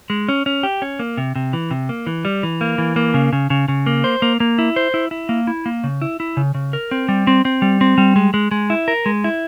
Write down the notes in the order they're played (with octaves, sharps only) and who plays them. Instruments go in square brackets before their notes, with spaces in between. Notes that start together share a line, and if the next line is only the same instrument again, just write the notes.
[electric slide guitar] G#3
C#4
C#4
G4
C#4
A#3
C3
C3
E3
C3
A#3
E3
G3
E3
A#3
E3
A#3
C#3
C#3
C#3
C#3
A#3
C5
A#3
A#3
E4
C5
E4
E4
A#3
E4
A#3
C#3
E4
E4
C#3
C#3
A#4
C4
G3
C4
C4
G3
C4
G3
G#3
G#3
G#3
E4
A#4
G#3
E4